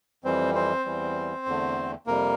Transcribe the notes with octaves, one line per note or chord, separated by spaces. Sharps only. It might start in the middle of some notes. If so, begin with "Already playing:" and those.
F2 E3 G3 C4 C5
C4 C5
E2 E3 G3
E2 D3 A3
F2 C3 G3 A#3 A#4